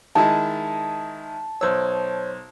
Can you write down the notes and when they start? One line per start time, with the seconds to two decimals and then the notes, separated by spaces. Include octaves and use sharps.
0.15 D#3 G#3 E4 A5
1.61 B1 C5 C#5 E6